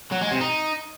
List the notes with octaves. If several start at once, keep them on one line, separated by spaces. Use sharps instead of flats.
F#3
G#3
C3
D#4